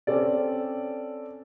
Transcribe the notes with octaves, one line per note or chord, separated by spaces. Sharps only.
C4 C#4 A4 D5